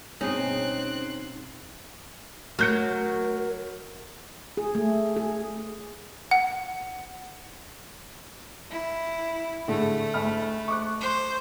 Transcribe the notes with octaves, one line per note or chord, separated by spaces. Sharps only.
G2 B2 C4 C#4 D#4 G#4 F#6 C7
F#3 A3 A#4 F6 G6 C#7
G#4
A3
G#4
F#5
E4
A2 D3 G#3 A3
D2 B5 F6
C#6 D6 F#6
C5